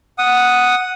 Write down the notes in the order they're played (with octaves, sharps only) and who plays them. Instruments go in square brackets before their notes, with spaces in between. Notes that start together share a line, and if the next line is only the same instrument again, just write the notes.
[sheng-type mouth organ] F#5 D#6